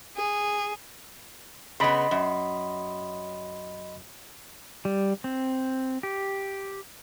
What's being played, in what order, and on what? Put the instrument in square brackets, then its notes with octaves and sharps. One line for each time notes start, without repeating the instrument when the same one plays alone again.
[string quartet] G#4
[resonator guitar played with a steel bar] C#3 B3 [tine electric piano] D#5 B5 C6
[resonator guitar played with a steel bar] F#2
[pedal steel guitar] G3
C4
G4